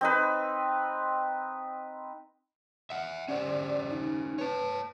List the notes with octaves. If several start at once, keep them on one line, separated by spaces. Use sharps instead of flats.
C4 D#4 B4
E5 F#5
C#4 G4 C5 D5
D#4
B4 C#5 A5